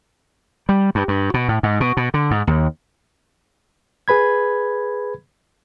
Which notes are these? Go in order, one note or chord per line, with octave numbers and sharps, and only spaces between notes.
G3
G2
G2
B2
A2
G#2
B2
B2
D3
G#2
D#2
G#4 B4 B5 G#6